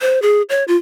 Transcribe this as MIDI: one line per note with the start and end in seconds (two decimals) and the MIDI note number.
0.01 0.21 72
0.22 0.42 68
0.49 0.64 73
0.68 0.77 65